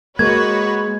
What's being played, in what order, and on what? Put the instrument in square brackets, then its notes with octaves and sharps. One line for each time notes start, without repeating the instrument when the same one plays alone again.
[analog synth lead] G#3 [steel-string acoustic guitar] A#3 [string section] F#4 B4 C#5 [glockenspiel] G#6